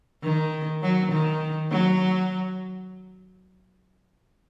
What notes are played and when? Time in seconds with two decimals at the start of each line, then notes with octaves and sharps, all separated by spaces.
0.23 D#3
0.82 F#3
1.12 D#3
1.71 F#3